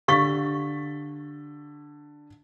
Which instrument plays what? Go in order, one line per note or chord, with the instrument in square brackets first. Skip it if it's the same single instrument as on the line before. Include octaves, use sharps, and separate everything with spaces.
[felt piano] D3 A6 B6 [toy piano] G4 F5 C#6